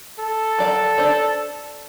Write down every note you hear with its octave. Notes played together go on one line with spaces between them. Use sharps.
A4
F#3 D5 F5
D4 C5 D5